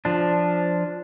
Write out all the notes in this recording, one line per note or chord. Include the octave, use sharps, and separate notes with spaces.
F3 D4